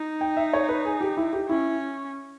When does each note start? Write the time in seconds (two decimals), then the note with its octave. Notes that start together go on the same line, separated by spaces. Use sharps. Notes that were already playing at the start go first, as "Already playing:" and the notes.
Already playing: D#4
0.21 G5
0.37 E5
0.53 C#5
0.69 B4
0.85 G#4
1.01 G4
1.17 E4
1.33 G4
1.49 C#4 E4